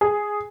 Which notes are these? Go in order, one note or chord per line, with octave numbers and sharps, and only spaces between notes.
G#4